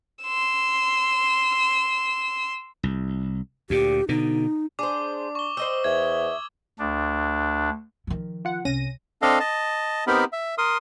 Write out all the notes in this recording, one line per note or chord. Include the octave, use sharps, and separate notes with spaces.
C6 E6
C2
D2 A#2 G4
B2 D3 D#4
D4 G#4 C5 D6
C#6 G7
C5 D#5 G5 D#6 E6 G7
E2 E5 G#6
D2 D4
D#3 F3
F4 F#5
C2 C#4 A#6 D#7
C4 D4 A4 D#5 F5
D#5 A5
B3 C4 D#4 G4 A#4 B5
E5
A#4 C6 D#6